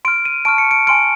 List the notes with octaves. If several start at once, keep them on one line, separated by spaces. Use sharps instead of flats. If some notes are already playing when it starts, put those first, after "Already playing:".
C6 F6 D7
D#7
A5 C#6 F6 D7
C#7
D7
G#5 C6 F6 D7